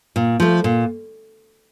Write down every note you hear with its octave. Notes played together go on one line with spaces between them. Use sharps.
A#2
F3 A3
A#2